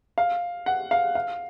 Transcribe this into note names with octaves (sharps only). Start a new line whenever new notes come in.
F5
F#5
F5
F5